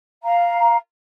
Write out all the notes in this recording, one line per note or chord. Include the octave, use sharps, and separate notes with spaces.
F5 A#5